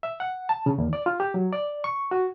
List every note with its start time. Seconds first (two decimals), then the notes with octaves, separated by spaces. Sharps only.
0.03 E5
0.20 F#5
0.49 A5
0.66 C#3
0.78 D#2
0.93 D5
1.06 F4
1.20 G4
1.34 F#3
1.53 D5
1.84 C#6
2.11 F#4